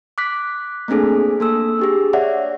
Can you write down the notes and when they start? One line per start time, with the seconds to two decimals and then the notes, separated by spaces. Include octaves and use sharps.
0.18 D6 F#6 B6
0.88 A3 A#3 C4 D4 G#4 A4
1.40 A#3 A4 E6
1.79 D4 G4 G#4
2.13 C#5 D5 E5 F#5